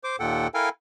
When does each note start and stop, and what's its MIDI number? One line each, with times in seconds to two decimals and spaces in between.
0.04 0.16 72
0.04 0.16 86
0.20 0.48 39
0.20 0.48 46
0.20 0.48 69
0.20 0.48 78
0.20 0.48 79
0.54 0.69 64
0.54 0.69 69
0.54 0.69 70
0.54 0.69 77
0.54 0.69 79
0.54 0.69 80